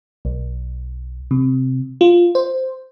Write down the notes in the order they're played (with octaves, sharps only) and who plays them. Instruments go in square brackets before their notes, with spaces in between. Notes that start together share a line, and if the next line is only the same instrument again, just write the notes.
[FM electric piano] B1
C3
F4
C5